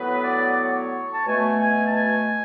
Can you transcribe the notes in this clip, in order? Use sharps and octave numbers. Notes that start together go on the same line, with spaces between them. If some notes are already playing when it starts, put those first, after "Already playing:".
Already playing: A2 F#3 B3 B4
D5
D5
C#5
A5
B2 A3 G#5
G#5
A5
G#5